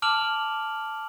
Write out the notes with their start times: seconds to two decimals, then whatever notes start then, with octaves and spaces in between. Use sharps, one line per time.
0.02 A5 D6 F6 D7 F7 F#7